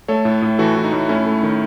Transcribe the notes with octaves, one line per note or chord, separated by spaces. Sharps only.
A3 A4 C#5
A2
A2
E3 F#4 A4
E3
D#4
A2
A3 C#4 E4
A3
D#3